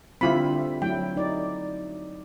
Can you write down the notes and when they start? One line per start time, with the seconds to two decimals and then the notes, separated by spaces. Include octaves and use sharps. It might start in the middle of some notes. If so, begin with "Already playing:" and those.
0.21 D3 G3 C4 E4 F4 B5
0.82 F#3 A3 E4 G5
1.17 D#4 D5